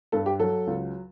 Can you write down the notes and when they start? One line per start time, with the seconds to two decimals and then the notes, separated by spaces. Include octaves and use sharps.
0.12 G2 A4
0.26 G4
0.40 F#3 A4
0.67 C#2